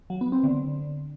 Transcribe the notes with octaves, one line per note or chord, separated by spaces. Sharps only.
F#3
B3
C4
D3